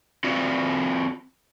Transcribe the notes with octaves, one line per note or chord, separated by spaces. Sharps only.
C4 F4 F#4 D5